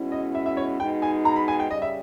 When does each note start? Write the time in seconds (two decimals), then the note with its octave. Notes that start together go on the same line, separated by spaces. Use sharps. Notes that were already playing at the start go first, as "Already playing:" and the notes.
Already playing: B2 G#3 C#4 E4
0.12 D#5
0.35 E5
0.46 E5
0.57 C#5
0.80 B2 G#3 D#4 G5
1.02 G#5
1.25 A#5
1.36 B5
1.48 G#5
1.59 G5
1.71 C#3 G3 D#5
1.82 E5